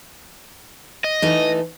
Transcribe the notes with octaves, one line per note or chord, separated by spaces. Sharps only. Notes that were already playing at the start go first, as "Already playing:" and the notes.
D#5
E3 A3 D#4